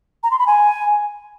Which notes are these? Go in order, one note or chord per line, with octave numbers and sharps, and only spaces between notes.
A#5
C6
B5
G#5